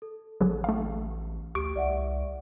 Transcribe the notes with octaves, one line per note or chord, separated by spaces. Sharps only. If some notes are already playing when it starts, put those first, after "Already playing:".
A4
A1 D3 F#3 G#4
A3 F5
D2 G4 C#6 D7
C2 D5 E5 F#5